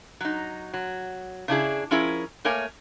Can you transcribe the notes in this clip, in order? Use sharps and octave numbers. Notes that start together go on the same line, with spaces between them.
F#3 D#4
F#3
C#3 D4 E4 G#4
F3 C#4 E4 G#4 A#4
A3 A#3 A#4 C#5 G#5